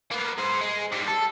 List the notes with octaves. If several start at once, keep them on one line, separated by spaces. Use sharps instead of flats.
A#3 B3
G#4 C5
G#3
G#2 G3
A4